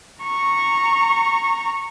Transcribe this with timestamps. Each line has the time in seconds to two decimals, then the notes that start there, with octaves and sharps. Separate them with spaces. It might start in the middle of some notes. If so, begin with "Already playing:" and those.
0.24 A#5 C#6